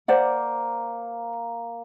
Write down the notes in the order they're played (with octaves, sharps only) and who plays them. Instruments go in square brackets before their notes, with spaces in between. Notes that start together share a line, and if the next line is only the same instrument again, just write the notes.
[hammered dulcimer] A#3 [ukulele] C5 D5 F#5